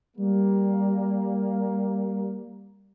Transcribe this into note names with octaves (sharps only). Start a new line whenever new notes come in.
G3 A#3